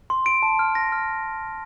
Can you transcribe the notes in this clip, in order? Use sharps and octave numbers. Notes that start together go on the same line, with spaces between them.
C6
D7
A5
F6
A#6
F6